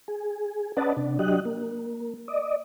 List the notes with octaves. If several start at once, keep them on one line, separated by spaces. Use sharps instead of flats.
G#4
C#4 B4 D5 D#5 F#5 A5
C3 D4
F#3 D4 G4 D#5 F#6
A#3
D5 D#5